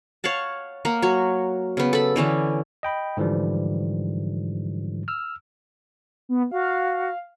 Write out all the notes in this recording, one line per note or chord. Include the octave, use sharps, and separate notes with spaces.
C#5 F5 F#5 A5
A#3 A#4 F#5
F#3 F#4 C#5
C#3 B3
A4 B5
D3 E3 C#4 D4
D#5 G5 B5
G#2 D3 E3 F3 G3
E6 F6
B3
F#4 F5